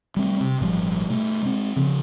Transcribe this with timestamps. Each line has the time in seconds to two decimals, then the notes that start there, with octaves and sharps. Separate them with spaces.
0.17 G3 A3 C4
0.41 C3
0.60 G#1 A#2 F3 G3
1.10 B2 A3
1.43 G#3 C4
1.76 C#3 F3